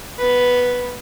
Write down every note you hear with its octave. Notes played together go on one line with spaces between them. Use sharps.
B3 B4